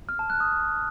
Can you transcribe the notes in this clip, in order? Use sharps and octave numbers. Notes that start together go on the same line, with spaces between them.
F6
A5
F#6
D#6